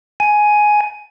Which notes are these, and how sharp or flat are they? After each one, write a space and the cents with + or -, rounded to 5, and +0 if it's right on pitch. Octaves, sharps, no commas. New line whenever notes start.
G#5 +10